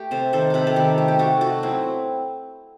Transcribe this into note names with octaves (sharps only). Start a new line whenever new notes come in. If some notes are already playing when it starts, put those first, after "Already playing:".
Already playing: A3 G4
C3 A4 C5
D#3 A4 C5
C3 G4 A4 B4
A4
D#3 G4 B4
A3
G4
A3 F#4 A4
A3 D#4 F#4
F#3 C4 E4